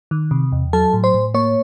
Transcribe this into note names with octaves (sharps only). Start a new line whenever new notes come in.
D#3
C3
E2
F#3 A4 A5
A2
C5 C6
A2
A#3 C#5 C#6